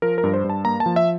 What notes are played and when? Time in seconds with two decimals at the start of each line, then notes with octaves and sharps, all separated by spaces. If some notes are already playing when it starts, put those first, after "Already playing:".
0.02 F3 A#4
0.18 A#4
0.24 G2
0.33 C5
0.44 G2
0.50 A5
0.65 A#3 A#5
0.80 A5
0.86 F3
0.96 E5